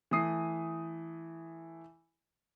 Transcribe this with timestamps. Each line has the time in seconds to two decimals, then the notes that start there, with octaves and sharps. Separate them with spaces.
0.11 E3 A3 D#6 C7